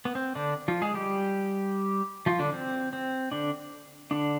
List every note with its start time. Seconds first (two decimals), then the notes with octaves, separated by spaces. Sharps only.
0.05 B3
0.15 C4
0.35 D3 D4
0.68 F3 F4
0.82 G#3 G#4
0.94 G3 G4
2.26 F3 F4
2.39 D3 D4
2.53 C4
2.93 C4
3.31 D3 D4
4.11 D3 D4